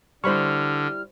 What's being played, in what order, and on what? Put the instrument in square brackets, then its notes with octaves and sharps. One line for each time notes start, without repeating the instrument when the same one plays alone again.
[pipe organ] D3 [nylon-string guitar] G3 E4 [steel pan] C5 B5 C#6 [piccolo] F6